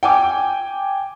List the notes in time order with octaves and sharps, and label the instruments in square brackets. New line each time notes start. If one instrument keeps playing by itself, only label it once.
[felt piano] G5 G#5 D6